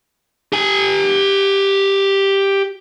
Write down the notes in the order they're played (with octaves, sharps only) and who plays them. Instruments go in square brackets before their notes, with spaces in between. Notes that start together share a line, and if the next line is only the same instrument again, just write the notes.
[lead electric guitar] G4 G#5